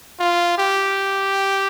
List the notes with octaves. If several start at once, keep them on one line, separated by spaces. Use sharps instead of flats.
F4
G4